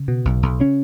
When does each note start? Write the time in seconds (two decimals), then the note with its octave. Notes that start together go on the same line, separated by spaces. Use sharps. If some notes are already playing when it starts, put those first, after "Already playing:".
Already playing: C#3
0.08 B2
0.25 B1
0.42 B1
0.60 C#3 C#4